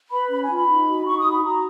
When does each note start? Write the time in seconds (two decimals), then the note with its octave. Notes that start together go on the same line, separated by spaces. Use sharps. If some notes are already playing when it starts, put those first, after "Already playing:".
0.11 B4 B5
0.30 C#4 B5
0.42 G#5
0.50 F4
0.56 B5
0.68 D#4
0.88 F#4
1.06 D#4 C#6
1.19 D#6
1.25 F#4
1.31 B5
1.43 F#4 A#5